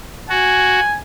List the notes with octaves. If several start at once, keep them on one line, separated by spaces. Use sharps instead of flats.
F#4 G#5